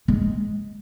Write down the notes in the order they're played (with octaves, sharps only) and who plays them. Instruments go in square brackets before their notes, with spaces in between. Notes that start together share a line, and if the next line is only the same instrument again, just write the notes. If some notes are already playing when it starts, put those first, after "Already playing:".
[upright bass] G#3